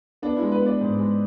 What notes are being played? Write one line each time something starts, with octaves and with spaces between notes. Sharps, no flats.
B3 D4
E4
G#3
B4
B3 D5
G#2
G#3